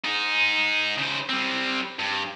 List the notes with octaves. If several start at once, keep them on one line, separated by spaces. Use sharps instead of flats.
D#4 G#4
C#3 C5
G3 C4
G2